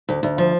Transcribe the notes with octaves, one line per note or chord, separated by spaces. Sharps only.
D2
D2
F3